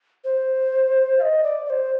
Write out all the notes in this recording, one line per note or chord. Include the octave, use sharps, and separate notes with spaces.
C5
F5
D#5
D5
D5
C5